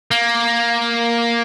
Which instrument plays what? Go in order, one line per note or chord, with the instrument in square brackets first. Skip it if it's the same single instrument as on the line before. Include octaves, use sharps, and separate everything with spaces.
[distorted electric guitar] A#3